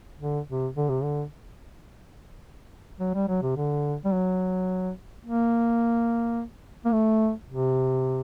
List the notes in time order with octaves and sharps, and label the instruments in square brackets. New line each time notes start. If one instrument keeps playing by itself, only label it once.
[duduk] D3
C3
D3
C3
D3
F#3
G3
F#3
C3
D3
G3
F#3
A#3
A#3
A3
C3